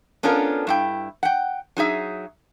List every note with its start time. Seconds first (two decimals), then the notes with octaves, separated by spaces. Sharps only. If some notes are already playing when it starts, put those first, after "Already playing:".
0.23 B3 C#4 D4 F4 A4 A#4
0.67 G2 E4 G5
1.23 F#5 G5
1.77 F#3 D#4 G#4 E5